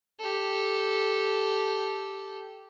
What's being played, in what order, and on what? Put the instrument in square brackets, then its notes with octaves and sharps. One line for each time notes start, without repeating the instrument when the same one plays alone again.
[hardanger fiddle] G4 A4